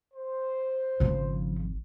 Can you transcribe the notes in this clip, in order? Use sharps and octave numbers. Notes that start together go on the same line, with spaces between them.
C5
G#1 C#3 F3